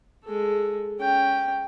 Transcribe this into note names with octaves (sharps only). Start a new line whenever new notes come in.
G#3 A4
C#4 G5